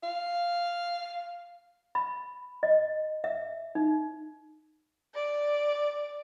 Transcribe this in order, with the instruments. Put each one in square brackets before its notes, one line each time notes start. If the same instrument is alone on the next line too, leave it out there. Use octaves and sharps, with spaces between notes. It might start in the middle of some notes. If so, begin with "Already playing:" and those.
[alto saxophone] F5
[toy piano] B5
D#5
E5
D#4
[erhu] D5